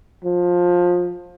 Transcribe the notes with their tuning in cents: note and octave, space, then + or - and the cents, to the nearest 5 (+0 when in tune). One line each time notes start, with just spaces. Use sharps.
F3 +20